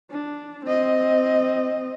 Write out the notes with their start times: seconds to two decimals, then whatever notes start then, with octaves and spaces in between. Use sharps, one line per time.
0.11 D4
0.65 C4 D#5